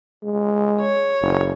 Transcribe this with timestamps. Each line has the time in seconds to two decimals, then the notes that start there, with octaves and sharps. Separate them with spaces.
0.23 G#3
0.81 C#5
1.22 F#1